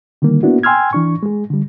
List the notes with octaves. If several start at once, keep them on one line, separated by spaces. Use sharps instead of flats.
D3 D#3 G3 A#3
A#3 B3 D4 E4 F#4
G5 G#5 C6 E6 F6 G#6
E3 D4 C#6
G#3 G#4
D3 G3